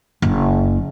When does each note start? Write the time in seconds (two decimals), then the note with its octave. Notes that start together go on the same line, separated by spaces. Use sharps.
0.22 F#1